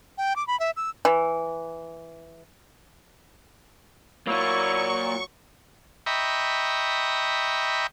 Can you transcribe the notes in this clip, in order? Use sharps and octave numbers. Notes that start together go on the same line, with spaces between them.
G5
D6
B5
E5
E6
E3
F#3 A#3 E4 F4 C#6
D#5 E5 G5 A#5 B5 C#6